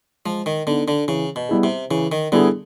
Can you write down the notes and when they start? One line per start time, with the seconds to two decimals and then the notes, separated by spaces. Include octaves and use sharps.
0.25 F3 G#3
0.46 D#3
0.67 D3 B3 D#4
0.88 D3
1.08 C#3 E3
1.36 B2
1.49 G3 B3 E4 G#4
1.63 C3
1.91 C#3 E3
2.12 D#3
2.32 D3 G3 B3 E4 G#4